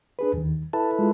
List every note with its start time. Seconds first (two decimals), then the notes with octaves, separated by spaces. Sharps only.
0.19 D4 G#4 B4
0.34 D#2 D#3
0.73 E4 A4 B4 A5
0.99 G#3 F4